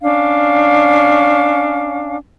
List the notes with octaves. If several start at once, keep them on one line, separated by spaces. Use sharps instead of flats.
C#4 D4 F5